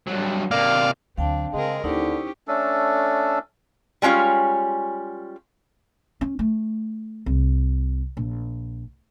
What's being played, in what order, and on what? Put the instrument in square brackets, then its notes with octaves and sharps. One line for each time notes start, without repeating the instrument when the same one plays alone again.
[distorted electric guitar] G2 F#3
[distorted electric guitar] C3 A#3 [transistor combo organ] D5 F5
[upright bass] D2 F#3 [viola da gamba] C4 D4 [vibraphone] F5 G5 A5
[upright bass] C#3 [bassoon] G#3 [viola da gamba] C4 G#4 A#4
[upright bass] D#2 [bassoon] D3 [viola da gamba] C#4 G4 [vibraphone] D#4 E4 C5
[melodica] A3 C#4 D4 A4
[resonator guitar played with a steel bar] G3 G#3 C#4 F4 C#5
[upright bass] C#4
A3
C2
A#1